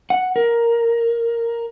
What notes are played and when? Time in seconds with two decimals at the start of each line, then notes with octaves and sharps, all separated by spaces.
0.10 F#5
0.36 A#4